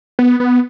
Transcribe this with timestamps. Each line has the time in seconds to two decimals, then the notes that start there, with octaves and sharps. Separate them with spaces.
0.19 B3
0.40 B3